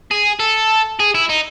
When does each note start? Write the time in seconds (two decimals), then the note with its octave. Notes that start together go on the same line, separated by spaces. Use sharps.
0.11 G#4
0.39 A4
1.00 G#4
1.15 E4
1.29 D#4